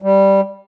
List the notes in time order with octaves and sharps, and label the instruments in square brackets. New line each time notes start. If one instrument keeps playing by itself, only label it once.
[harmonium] G3